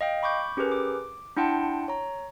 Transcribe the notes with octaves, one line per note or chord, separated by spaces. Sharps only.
D#5 F5 G5
B5 C#6 D6 G6
C#4 G4 G#4 A#4 B4
D6
D4 E4 F#5 G5 A5 C6
C#5 A#5